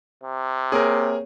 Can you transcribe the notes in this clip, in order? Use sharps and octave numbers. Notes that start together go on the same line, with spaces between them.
C3
A#3 C4 G#4 A#4 C#5